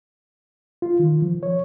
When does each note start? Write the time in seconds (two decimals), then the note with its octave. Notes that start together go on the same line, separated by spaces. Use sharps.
0.82 F4
1.00 D#3
1.22 F3
1.43 C#5